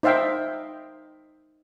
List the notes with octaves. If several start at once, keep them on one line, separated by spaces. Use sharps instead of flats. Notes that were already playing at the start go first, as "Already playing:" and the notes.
D#4 C5 E5 F5 G5